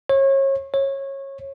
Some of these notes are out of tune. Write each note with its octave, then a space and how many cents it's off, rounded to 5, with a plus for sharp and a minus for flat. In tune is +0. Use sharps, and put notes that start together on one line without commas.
C#5 -30
C#5 -20